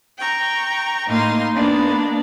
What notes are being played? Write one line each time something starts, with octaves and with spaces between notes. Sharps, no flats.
G5 A#5 C#6
A2 A#3 D#4 F5 C6
A#3 B3 D4